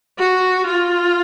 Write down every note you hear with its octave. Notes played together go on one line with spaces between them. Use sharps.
F#4
F4